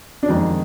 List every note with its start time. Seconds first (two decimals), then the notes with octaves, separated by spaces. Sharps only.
0.23 D4
0.28 F2 D#3 G#3 C4 D#4